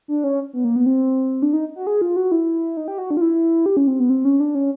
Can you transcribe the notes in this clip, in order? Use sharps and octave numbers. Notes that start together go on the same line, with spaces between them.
D4
C#4
B3
A#3
B3
C4
D4
D#4
F#4
G#4
F4
F#4
E4
D#4
G4
F#4
D4
F4
E4
G4
C#4
C4
B3
C4
C#4
D4
C#4